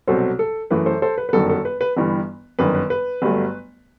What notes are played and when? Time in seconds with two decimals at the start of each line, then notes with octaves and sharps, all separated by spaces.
0.07 C2 B2 F#3 A4 C5
0.39 A4
0.70 F#2 E3 A3 B4
0.86 A4 C5
1.02 A4 C5
1.18 B4
1.29 B4
1.33 G1 F#2 D#3 F#3 A4
1.49 A4
1.65 B4
1.81 B4
1.97 G1 G2 E3 G3
2.59 G1 F#2 D#3 B4
2.75 B4
2.90 B4
3.22 G1 G2 F#3 A3